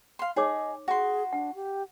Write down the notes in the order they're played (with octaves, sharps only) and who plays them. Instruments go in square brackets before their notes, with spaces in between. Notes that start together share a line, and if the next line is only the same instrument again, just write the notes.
[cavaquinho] F5 C6
[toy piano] D#4 C#5 D6 [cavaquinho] G#4 [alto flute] D#5
[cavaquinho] F#4 C6 [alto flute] G#4
[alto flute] D4 [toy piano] F#5
[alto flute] G4